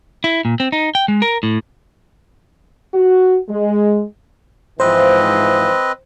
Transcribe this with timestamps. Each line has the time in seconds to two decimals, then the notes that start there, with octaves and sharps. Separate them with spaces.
0.24 E4
0.45 A#2
0.60 C4
0.72 D#4
0.95 G5
1.08 G#3
1.22 A#4
1.43 A2
2.94 F#4
3.49 G#3
4.80 G#2 E3 F3 C4 B4 C5 D#5